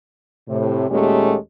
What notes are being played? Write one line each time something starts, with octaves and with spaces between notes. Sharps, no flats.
A2 C3
D#2 A#2 G#3 A3 C#4 G4